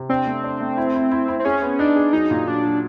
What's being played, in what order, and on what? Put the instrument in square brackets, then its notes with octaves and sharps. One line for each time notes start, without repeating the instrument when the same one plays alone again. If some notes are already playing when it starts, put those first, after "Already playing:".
Already playing: [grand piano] C3
[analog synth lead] C4 [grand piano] D4
[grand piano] A3
D4
A3
E4
E4
E4
E4
[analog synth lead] C4
[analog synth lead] C#4 [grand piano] G#4
[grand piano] B3
[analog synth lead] D4 [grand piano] D#4
[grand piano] G#4
[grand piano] F#3 [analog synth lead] D#4
[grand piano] A#2
[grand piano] F#3 [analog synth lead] D4
[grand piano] F#3